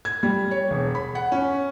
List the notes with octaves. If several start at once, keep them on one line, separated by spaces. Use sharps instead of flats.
G#6
G3
C#5
E1
B5
F#5
C#4